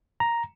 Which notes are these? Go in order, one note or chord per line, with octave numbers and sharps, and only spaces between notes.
A#5